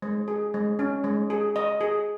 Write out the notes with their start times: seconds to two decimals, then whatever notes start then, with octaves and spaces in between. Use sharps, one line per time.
0.02 G#3
0.28 G#4
0.54 G#3
0.79 C#4
1.04 G#3
1.30 G#4
1.56 D#5
1.81 G#4